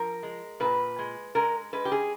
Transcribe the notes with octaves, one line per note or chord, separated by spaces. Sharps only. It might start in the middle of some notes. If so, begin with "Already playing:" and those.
Already playing: F3 A#4
G#3
A#2 B4
G#3
G#3 A#4
G#3 B4
G4
G#4